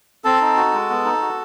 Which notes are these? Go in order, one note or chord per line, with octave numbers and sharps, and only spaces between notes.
C4 A4 A5
D#4
F#4
G#3
B3
D#4
F#4